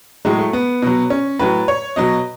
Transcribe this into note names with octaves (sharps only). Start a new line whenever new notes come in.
A2 F#3 G#3
A3
B3
B2 F#3
C#4
A2 F#3 B4
C#5
B2 F#3 D#5